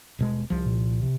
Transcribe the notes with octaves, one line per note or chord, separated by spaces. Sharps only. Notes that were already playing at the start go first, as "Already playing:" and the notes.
D#1 B2 G#3
C2 F3
A#2
C3